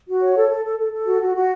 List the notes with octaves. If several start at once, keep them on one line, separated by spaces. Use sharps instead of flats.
F#4
C#5
A4
A4
A4
A4
A4
F#4
F#4
F#4